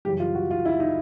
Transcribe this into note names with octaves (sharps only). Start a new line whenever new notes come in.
F#2 C#3 E3 G3 G4
F4
F#4
F4
E4
D#4